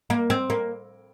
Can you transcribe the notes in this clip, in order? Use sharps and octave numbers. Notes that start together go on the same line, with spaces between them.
A#3
C4
A#3